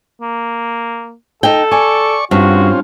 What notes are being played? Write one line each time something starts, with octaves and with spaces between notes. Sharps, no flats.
A#3
D#4 A4 G5
D5 G#5 C#6
G2 C4 C#4 F4 F#4